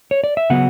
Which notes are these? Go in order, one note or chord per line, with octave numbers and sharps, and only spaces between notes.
C#5
D5
E5
C#3 F#3 B3 F#5